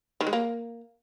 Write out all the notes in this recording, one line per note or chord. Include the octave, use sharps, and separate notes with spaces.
D#3
G#3
A#3